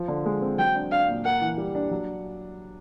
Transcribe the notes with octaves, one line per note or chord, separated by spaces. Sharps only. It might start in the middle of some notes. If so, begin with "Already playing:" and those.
Already playing: F3
D3
G#3
C4
F#3 G5
D4
D4 F5
A#2
A#3 F#5
E3
G3
D4
F#3